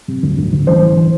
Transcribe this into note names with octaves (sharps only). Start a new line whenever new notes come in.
C3
D2
D2
D2
A1 C5
A1
E3